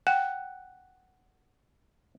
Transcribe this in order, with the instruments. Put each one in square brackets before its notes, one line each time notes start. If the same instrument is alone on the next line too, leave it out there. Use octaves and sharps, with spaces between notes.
[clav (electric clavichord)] F#5 [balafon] G5